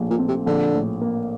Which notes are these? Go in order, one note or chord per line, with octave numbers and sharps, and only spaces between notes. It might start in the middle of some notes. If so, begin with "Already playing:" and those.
Already playing: A#1 A2 A3
A#2
C4
C3
A#1 D3
A2
A#3